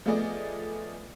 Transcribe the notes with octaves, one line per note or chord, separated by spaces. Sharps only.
F3 A3 B3 G#4 D5 D#5